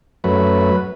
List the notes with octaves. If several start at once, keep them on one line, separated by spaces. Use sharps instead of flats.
F#2 F#3 A3 B4